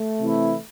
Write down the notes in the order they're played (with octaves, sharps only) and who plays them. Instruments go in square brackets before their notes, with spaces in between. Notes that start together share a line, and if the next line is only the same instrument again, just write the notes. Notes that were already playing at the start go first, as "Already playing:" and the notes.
Already playing: [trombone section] A3
[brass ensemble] C3 E3 C4 E4